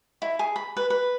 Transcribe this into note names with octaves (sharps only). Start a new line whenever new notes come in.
E4
G#4
B5
B4
B4